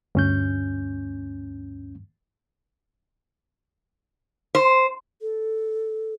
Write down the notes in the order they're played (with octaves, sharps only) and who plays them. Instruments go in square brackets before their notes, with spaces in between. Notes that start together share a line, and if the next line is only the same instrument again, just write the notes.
[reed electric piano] D2 C#4 G6 [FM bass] G2
[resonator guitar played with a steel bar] C5
[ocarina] A4